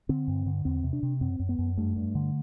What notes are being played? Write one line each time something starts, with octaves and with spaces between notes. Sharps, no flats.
D3 C4
G2
D3
E2 C4
C3
D4
C3
F#2 C4
F#2
B3
F#2
G2 A3
G2
D3